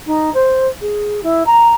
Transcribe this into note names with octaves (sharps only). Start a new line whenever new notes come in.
D#4
C5
G#4
E4
A#5